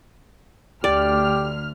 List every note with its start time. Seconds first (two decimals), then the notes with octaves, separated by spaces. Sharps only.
0.84 D2 G4 D5 F6